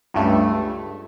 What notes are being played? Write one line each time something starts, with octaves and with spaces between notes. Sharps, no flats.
C#2 G2 A3